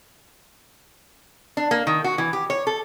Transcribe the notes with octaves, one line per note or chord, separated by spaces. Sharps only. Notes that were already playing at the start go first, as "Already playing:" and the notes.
D4
A#3
D#3
F#4
E3
G4
C#5
A4